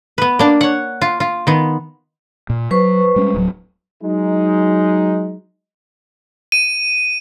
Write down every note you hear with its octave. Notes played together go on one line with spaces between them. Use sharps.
B3 B4
A#3 D4
C#5 F#5
F4
F4
D#3 B3
A#2
F#3 B4 C5 C#6
G3 G#3 C#4
D1 F#3
F#3 G#3 D#4
D#7